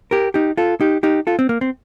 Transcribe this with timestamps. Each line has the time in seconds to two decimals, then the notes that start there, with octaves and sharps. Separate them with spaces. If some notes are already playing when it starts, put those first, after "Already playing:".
0.11 G4 A#4
0.34 D#4 G4
0.57 F4 A4
0.81 D#4 G4
1.03 D#4 G4
1.27 F4 A4
1.39 C4
1.49 A#3
1.61 C4